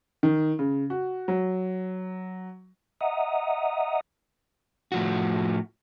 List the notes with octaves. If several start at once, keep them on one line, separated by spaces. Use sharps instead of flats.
D#3
C#3
F#4
F#3
D#5 E5 F#5 A#5 D#6
A2 F3 F#4